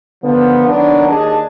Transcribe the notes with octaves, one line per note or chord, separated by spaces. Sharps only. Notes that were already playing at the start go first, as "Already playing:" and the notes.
D3 D#3 F3 B3
D#3 F#3 A#3 B3 D4
D#2 D4 G#4 D#5 A5